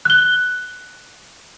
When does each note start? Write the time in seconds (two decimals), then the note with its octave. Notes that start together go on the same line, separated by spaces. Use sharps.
0.05 F#6 G7